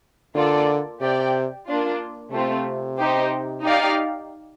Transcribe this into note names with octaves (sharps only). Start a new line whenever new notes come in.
D3 A#3 F4 A4 D5
C3 G4 D5 G5
A#3 D4 F4
C3 A3 C4 F4
D#4 G4 C5
D#4 G4 D5 F5